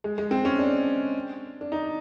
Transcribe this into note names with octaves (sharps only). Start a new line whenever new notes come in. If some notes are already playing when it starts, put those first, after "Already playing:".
G#3
G#3
C4
C#4
D4
D4
D#4